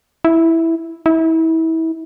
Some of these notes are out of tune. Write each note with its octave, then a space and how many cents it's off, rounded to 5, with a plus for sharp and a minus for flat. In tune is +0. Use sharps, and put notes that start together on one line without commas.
E4 -5
E4 -30